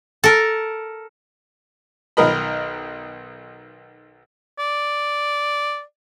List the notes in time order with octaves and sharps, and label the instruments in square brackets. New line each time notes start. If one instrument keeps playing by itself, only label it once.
[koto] A4 A#4
[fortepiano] B1 D#3 A#4 D#5 B5
[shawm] D5